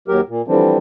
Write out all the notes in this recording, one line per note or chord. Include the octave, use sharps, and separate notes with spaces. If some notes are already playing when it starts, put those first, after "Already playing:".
D#2 F#3 G4 A#4
A#2
D3 E3 F3 G3 C4 D4